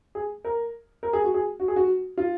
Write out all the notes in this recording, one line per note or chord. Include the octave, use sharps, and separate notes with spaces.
G#4
A#4
A#4
G#4
F#4
G#4
F#4
G#4
F#4
F4